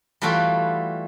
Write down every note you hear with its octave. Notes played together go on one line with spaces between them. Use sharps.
E3 G3 A3 F4 F#4 A4